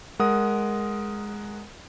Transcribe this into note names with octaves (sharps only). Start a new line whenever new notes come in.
G#3 A#4 F#5 D#6